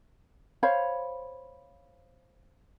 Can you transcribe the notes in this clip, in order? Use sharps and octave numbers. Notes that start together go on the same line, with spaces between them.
C5 C#5 F5 B5